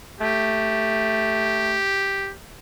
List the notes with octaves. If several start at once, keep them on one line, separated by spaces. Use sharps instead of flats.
A3 G4